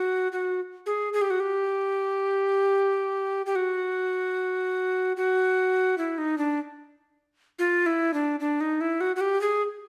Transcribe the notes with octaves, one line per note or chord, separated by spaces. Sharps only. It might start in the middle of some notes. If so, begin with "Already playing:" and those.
Already playing: F#4
F#4
G#4
G#4
G4
F#4
G4
G4
F#4
F#4
E4
D#4
D4
F4
E4
D4
D4
D#4
E4
F#4
F#4
G4
G#4